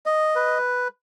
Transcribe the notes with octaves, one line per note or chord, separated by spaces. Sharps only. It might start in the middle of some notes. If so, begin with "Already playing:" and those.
D#5
B4